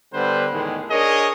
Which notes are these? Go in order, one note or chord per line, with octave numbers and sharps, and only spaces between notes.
D3 G3 B3 B4 C5
E2 A2 D#3 G#3
D4 G#4 A#4 C#5 D#5